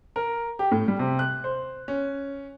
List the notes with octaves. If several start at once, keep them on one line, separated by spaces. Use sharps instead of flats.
A#4
G4
A2
G3
C3
F#6
C5
C#4